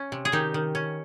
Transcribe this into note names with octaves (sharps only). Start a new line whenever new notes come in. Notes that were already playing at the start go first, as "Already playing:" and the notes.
Already playing: C#4
C3
G#4
D#3 D#4 G4
D#3
C#4